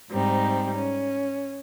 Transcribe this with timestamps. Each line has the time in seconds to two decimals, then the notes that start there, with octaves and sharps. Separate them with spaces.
0.11 G#2 G3 C4 D#4
0.76 C#4